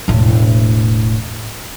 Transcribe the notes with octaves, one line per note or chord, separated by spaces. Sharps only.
E1 A2